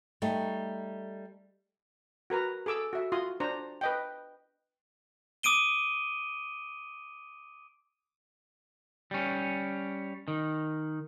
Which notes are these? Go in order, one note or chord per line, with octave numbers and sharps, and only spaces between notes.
G3 A3 D#4
F#4 A#4 B4 A#5
G#4 A4 D6 E6
F#4 E5
F4 F#4 C6 D#6
D4 C5 A#5
B4 D#5 G5
D6 D#6 D7 D#7 G7
G3 C#4
D#3